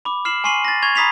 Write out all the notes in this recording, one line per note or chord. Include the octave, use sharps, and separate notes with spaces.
B5 D6
F6 C7 E7 F#7
G#5 C6 C#6 C7 D#7 F#7
A6 A#6
C#6 G#6 F7
A#5 B5 D#6 B6 C7 F7